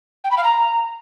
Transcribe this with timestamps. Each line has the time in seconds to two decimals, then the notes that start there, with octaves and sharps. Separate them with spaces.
0.24 G5
0.31 B5
0.37 F5
0.44 A#5